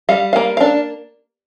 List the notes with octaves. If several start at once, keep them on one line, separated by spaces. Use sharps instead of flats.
G3 F5
A#3 F5
D4 F5